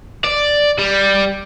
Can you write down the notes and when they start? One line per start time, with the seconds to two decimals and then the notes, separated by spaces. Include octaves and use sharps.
0.25 D5
0.78 G3